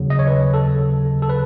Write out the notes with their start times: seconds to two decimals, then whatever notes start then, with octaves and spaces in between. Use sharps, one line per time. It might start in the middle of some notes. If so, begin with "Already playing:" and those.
Already playing: D#2 C#3 F#3
0.10 D#5
0.19 C#5
0.27 B4
0.54 A4
1.22 A4
1.29 B4